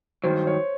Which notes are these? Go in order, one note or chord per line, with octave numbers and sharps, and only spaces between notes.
G2 D#3 F#3 C5
C#5